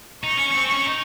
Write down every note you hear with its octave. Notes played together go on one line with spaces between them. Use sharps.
D#4 C#6
C#4
C#4
C4
C#4
D#4